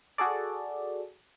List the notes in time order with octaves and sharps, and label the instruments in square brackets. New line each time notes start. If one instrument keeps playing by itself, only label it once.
[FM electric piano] F#4 G#4 A4 D5